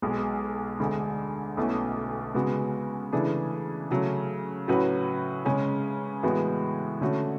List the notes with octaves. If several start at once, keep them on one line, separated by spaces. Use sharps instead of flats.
B1 B2 G#3
D2 D3 G#3
B1 B2 A3 C#4 E4
C#3 G#3 B3 F#4
C#3 E3 A3 D4 G#4
C#3 F#3 A3
A2 F#3 C#4 F#4 B4
C#3 G#3 C#4 G#4
A2 E3 G#3 B3 F#4
D3 A3 C#4 F#4